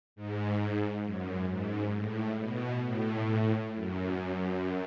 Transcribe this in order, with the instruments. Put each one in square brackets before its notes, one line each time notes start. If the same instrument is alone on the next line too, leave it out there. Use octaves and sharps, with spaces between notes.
[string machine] G#2
F#2
G#2
A2
B2
A2
F#2